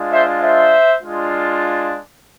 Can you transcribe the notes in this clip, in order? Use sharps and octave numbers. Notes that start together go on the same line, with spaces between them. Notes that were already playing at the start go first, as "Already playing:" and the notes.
Already playing: G#3 D4 F4
C5 E5
C5 E5
G#3 D4 F4